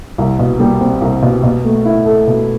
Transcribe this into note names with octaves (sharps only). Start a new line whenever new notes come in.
C2
B2
G3
C4
C2
B2
B2
A3
E4
A4
B2